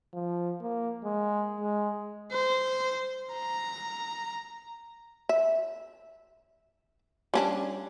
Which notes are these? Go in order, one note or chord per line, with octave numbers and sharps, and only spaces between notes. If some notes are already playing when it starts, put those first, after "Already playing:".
F3
A#3
G#3
G#3
C5
A#5
E5
G3 C#4 D4